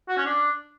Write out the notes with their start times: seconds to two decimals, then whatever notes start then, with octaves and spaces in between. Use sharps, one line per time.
0.09 F#4
0.17 C#4
0.25 D4